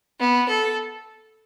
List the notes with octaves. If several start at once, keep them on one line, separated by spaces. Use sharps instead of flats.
B3
A4